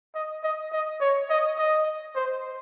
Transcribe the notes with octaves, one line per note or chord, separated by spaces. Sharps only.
D#5
D#5
D#5
C#5
D#5
D#5
C5